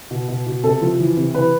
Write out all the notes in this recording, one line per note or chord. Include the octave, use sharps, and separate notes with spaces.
B2
B2
B2
C3 A4
F3
E3
C3
E3 B4